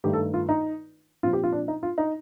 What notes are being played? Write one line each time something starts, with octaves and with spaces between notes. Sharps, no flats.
G2 D#3 A3 G4
A4
F4
D#4
A#2 F3 C4 F4
G4
F4
D4
D#4
F4
D#4